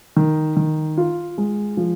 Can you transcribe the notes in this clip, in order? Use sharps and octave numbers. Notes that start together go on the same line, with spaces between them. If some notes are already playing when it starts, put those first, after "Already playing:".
D#3
D#3
F4
G#3
F3